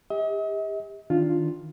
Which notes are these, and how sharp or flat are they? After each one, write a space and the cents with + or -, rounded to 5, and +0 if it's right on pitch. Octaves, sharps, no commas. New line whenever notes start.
G4 +35 D#5 +45
D#3 +0 D4 -10 F4 +0